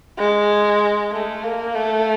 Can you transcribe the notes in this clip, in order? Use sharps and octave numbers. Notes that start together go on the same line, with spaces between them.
G#3
A3
A#3
A3